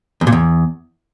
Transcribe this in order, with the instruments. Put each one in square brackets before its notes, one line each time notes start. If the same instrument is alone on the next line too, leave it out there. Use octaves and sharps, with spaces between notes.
[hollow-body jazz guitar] E2
A#2
E2